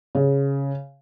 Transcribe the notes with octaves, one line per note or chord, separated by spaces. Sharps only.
C#3